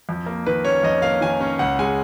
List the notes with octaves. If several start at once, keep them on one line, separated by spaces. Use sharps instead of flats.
F2
A#3
D#3 B4
C#4 C#5
F2 D#5
A#3 F5
D#3 G#5
C#4
C#2 F#5
G#3 G#5